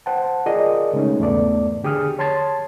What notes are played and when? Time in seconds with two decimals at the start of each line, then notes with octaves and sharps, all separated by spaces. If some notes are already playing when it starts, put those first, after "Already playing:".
0.06 C5 F#5 G5 A5
0.46 F4 G#4 A#4 D5 D#5 D#6
0.93 C#3 G#3 A3 C#4 D#4
1.20 E2 G#2 A3 B3 D5
1.84 D3 G4 G#4 D#6 F6
2.19 C#5 A5 C6 G#6 A6